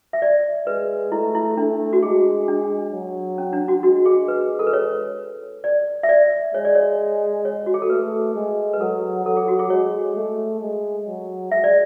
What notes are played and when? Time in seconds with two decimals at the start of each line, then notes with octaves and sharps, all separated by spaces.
0.13 E5
0.22 D5
0.67 G#3 B4
1.11 A3 E4
1.35 E4
1.57 A3 D4
1.93 F#4
2.02 G#3 G#4
2.48 D4
2.92 F#3
3.38 C#4
3.53 D4
3.68 F#4
3.83 G#3 F#4
4.06 G#4
4.28 B4
4.59 A4
4.67 B4
4.73 C#5
5.64 D5
6.03 E5
6.09 D5
6.54 G#3 C#5
6.65 D5
6.75 C#5
7.45 C#5
7.66 F#4
7.74 G#4
7.82 A4
7.90 A3 B4
8.35 G#3
8.73 B4
8.80 F#3 A4
9.26 F#3 A4
9.37 G#4
9.48 F#4
9.59 G#4
9.70 G#3 C#5
10.16 A3
10.61 G#3
11.07 F#3
11.51 G#3 E5
11.64 D5